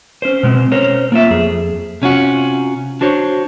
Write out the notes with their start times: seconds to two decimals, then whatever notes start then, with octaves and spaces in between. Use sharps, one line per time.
0.22 C#4 C5
0.43 B2 G#3 B3 C4
0.72 C#4 A#4 C5 C#5
1.12 A#3 F4 E5
1.30 F2 G#4
2.02 C3 C#4 F4 F#4
3.01 D4 F#4 C5 C#5